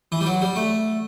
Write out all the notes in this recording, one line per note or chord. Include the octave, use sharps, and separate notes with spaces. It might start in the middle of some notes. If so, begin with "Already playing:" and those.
E3
G3
F#3
G3
A3